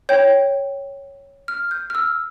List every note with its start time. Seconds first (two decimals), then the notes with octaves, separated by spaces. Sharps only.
0.09 C#5 G5 G6
1.48 F6
1.71 G6
1.90 F6
1.95 E6